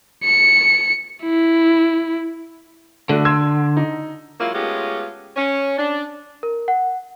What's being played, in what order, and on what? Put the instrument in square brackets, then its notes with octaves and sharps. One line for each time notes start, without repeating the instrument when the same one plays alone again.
[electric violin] C#7
E4
[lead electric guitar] D3 [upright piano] A3 D4 F#4
[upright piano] C6 E6 G#6
D#4
[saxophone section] F#3 G#3 A#3 E4 F4
G#3 A3 B3 C#4 F4 G4
C#4 C#5
D4
[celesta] A#4
F#5